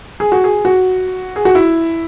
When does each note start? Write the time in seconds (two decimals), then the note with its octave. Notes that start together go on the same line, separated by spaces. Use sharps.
0.20 G#4
0.32 F#4
0.44 G#4
0.65 F#4
1.36 G#4
1.45 F#4
1.55 E4